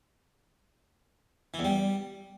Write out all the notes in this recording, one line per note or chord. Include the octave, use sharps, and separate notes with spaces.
E3
E2
G3